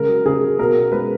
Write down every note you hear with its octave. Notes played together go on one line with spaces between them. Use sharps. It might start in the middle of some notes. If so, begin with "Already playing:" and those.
Already playing: C#3 G#3 A#4
F#3
C#3 G#4
F#3
B2 A#4
B2
G#3 B4